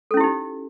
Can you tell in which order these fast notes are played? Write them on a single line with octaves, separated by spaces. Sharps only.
A4 C#4 E4 G4 D#4